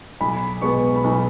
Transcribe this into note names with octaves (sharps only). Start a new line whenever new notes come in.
B1 B5
B2 G#3 B3 C#6
B5
B1 C#6